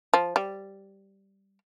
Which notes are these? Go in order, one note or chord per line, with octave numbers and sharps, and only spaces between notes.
F3
G3